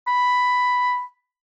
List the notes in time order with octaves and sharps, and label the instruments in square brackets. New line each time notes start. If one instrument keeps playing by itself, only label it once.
[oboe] B5